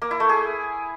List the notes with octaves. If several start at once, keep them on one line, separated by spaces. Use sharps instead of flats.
A#3
E4
A3
G#4